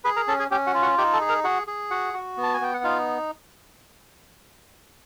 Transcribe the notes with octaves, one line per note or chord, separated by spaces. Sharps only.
G#4 B4 B5
A#4 A#5
C#4 A4 A5
G#4 G#5
C#4 G4 G5
F#4 F#5
F4
F#4 F#5
D#4 G4 G5
A4 A5
G#4
A#4 A#5
F#4 G#4 F#5
G#4
F#4 F#5
F#4
B3
A5
G#5
B3 G5
F#5
D#4 F4 F5